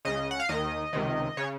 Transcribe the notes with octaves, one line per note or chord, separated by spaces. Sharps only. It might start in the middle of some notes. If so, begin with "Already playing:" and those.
C#2 C#3 D#5
F#5
F5
D#2 D#3 D#5
C#2 C3 D#3
C#3 C#5